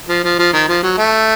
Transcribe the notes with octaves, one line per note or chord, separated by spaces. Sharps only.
F3
F3
F3
D#3
F3
F#3
A3